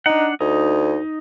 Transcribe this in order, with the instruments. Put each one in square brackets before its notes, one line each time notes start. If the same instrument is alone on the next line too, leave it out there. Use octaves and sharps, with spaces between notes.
[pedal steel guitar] D4 F#5 [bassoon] D#4
[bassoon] D2 [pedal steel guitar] D#4